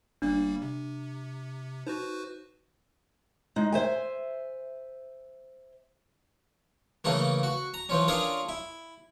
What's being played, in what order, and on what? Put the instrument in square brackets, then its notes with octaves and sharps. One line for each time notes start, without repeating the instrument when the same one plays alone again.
[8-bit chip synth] G1 G3 A#3 [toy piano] D4
[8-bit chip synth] C3
[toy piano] D#4 [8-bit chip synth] F#4 B4 C5
[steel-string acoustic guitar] G#3 D#4
C5 E5 G#5
[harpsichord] C#3 E3 A3 A#3
F#4
A#5
E3 F3 C#4
C#4 D4 F4 G#4 A#4
E4